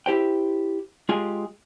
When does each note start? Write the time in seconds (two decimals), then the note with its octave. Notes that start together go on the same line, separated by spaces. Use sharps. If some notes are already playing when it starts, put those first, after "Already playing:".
0.06 E4 G4 C5 G5
1.09 G#3 F4 G4 G#4 G#5